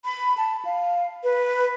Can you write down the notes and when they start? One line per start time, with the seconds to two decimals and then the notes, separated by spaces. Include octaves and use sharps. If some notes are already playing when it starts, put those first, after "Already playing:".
0.05 B5
0.37 A5
0.65 F5
1.23 B4